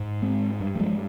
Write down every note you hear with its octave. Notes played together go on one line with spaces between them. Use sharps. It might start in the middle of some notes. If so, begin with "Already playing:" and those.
Already playing: G#2
G#3 C4
G2
G3
F3 G#3